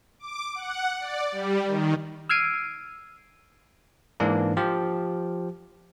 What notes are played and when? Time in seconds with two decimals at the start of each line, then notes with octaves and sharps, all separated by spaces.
0.19 D6
0.55 F#5
1.00 D5
1.32 G3
1.66 D#3
2.29 E6 F6 G#6 C7 D7 D#7
4.20 G#2 E3 A#3 D4
4.57 F3 G4